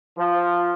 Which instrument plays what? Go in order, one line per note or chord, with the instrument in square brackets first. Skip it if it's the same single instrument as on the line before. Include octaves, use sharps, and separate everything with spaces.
[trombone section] F3